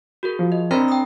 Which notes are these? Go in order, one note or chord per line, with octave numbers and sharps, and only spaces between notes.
F#4 G#4 A#4
F3
D#5
C4 D4 A#4 A#5 B5 F6
G5 D#6